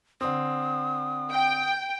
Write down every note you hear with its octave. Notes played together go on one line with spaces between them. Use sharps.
D3 C4 D#6
G5